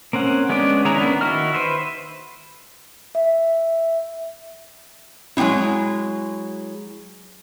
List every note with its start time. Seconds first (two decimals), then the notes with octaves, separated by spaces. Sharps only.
0.13 A#3 C4 C#4 F#5
0.49 G#3 B3 C#4 D4 D5
0.85 D#3 E4 G#4 C#5 A#5
0.98 A#3 B3 C#4 D4
1.21 D#3 E4 F#4 D#5 F6
1.53 B4 C5 E5
3.15 E5
5.37 F#3 G#3 C4 D#4 E4